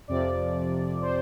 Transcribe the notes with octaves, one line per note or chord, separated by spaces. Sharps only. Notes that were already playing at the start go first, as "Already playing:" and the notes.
F2 C3 F3 D5
C5